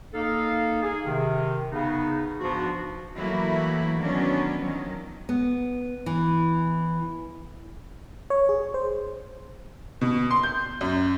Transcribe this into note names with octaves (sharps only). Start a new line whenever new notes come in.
A#3 D#4 A4 F5
G#4
C3 D#3
C#3 B3 D#4
G#2 F3 B3 D4 F#4
E3 F#3 A3 A#3 E4 F#4
D#3 F#3 B3 C#4 D4
D#3 F3 F#3
B3
E3
C#5
G#4
C5
B2
C6
G6
F#2